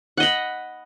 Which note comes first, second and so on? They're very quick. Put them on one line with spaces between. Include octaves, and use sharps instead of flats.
F#5 D#5 B5